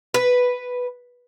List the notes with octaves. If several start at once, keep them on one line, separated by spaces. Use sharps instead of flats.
B4